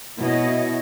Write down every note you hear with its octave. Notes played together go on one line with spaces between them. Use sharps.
B2 E4 C#5 D#5